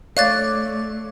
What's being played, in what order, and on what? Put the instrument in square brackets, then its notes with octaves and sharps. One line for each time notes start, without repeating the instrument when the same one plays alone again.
[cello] A3 [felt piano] C#5 [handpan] D5 [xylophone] F5 F#6 A6